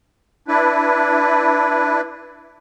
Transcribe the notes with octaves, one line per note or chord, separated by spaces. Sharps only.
D4 E4 B4